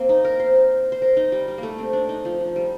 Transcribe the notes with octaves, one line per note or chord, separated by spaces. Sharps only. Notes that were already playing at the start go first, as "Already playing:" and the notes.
Already playing: A#3 C4
D#4
A#4
C5
C5
A#4
D#4
G3
G3
A#3
A3
C4
D4
D#4
F3
F3
G3